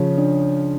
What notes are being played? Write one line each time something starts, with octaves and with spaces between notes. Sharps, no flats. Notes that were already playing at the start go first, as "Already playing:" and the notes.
Already playing: C#3 F3 C#5
D4